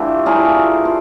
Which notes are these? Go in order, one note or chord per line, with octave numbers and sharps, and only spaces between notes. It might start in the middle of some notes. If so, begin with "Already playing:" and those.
Already playing: E3 A3 D4 F4 G4
E3 A3 D4 F4 G#4 A#4
F4